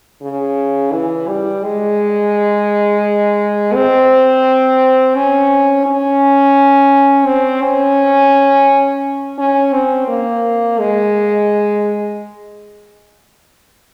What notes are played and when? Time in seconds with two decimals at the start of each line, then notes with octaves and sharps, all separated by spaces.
0.22 C#3
0.93 E3
1.28 G3
1.64 G#3
3.74 C4
5.16 C#4
5.86 C#4
7.26 C4
7.62 C#4
9.38 C#4
9.73 C4
10.08 A#3
10.79 G#3